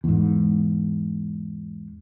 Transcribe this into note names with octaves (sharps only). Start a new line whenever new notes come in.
E2 G#2